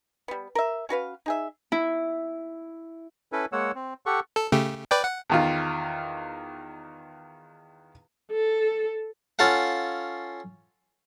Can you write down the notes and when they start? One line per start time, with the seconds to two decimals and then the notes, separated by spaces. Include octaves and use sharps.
0.28 G3 B3
0.55 A#4 E5
0.89 C#4 F#4 B4 F5
1.26 D#4 G#4 E5
1.72 E4
3.32 C#4 E4 A4 B4
3.52 G#3 A#3 C#5 F#5 E6
3.75 C4
4.06 G4 A4 F#5 C#6
4.36 A4
4.52 C#3 A3 G4
4.91 B4 D5 G5
5.04 F#5
5.30 E2 D#3 F4
8.32 A4
9.39 C#4 F4 A4 F5 F#5